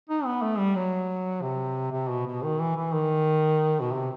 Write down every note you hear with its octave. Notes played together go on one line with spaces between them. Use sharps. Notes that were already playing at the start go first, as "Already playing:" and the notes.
D#4
B3
A3
G3
F#3
C3
C3
B2
B2
D#3
E3
E3
D#3
B2
C3